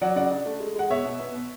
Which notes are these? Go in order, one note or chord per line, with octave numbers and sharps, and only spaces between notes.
F#3 D5 F#5
C#3 D5 F#5
D4
A3
G#3
G#3 F#5
B2 C#5 E5
B2
B3
B2